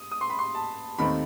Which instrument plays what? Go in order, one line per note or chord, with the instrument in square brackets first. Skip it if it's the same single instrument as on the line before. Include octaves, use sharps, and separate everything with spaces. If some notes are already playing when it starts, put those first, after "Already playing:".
Already playing: [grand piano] D#6
D#6
C6
B5
C6
A5
D#2 D#3 A3 C4 B5